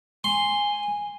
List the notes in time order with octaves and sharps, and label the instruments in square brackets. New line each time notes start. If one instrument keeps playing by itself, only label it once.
[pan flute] G#5 [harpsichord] C6